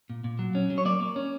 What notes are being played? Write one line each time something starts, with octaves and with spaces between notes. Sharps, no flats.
A#2
A#2
F#3
C#4
F#3
C#5
A#3 D5
A#3
C#4